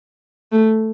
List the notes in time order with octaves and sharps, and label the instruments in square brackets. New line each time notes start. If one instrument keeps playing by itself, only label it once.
[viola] A3